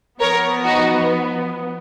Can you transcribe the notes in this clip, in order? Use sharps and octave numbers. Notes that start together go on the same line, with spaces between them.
F3 B3 A#4 C#5
D#4 F#4